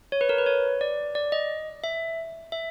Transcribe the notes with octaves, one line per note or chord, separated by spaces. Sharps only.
C#5
B4
A#4
B4
C#5
D5
D5
D#5
E5
E5